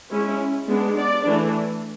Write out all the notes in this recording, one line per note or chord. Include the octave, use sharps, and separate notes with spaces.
G#3 C#4 E4
G#3 B3 D4
D5
E3 A3 D4